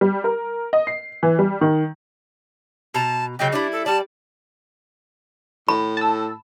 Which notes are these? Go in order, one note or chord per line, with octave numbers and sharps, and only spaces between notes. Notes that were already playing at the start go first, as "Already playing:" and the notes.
G3
A#4
D#5
C7
E3
G3
D#3
B2 A5 A#5
C#3 F#3 D#4 G5
G3 D4 E4
A4
G3 D5 A5
A2 B5
A5 E6